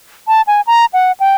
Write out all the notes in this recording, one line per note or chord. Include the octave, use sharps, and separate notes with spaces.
A5
G#5
A#5
F#5
G5